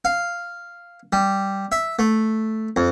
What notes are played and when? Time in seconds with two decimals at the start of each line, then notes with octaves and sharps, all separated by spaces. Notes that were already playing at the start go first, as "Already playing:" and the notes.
0.05 F5
1.13 G3
1.72 E5
1.99 A3
2.76 F2